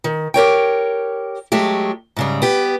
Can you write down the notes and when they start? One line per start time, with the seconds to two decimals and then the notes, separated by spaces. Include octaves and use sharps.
0.04 D#3
0.34 G4 A#4 C#5 G5
1.52 F#3 G#3 A3 G4
2.16 G#2 C#3 G3
2.42 B3 G4